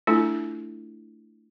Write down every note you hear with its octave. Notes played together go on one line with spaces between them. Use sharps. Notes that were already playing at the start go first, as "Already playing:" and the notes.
A3 D4 E4 F4 A4